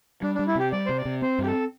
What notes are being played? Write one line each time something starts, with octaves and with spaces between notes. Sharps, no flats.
G3 D4
D4
G3
E4
C3 G4
G3 D5
C3 C5
D5
C3
C4 C5
G2 G4
A4